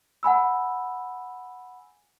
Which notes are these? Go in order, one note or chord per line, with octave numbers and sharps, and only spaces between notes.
F#5 G#5 B5 E6